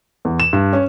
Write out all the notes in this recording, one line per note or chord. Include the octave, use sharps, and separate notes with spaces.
E2
E7
G2
C#4